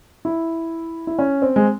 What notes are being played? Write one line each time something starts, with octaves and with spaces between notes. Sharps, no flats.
E4
E4
C#4
C4
G#3